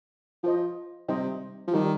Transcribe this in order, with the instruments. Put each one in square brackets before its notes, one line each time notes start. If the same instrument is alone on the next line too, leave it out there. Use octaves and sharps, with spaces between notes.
[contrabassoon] F3 [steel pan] F4 C5 D#5
[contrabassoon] C3 [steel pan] G3 D#4 C5 D#5 G5
[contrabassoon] F3
[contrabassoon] D#3 [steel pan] G3 D#4 G4